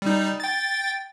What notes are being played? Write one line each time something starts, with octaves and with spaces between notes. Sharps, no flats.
G3 D#4
G5 A6